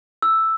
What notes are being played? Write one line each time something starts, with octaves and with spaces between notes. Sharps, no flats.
E6